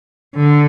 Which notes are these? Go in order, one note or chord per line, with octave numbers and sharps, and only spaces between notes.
D3